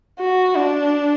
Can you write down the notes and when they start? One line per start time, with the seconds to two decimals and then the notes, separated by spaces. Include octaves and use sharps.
0.19 F#4
0.55 D4